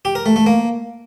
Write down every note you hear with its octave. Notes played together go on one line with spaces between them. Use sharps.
G4
A#4
A3
A3
A#3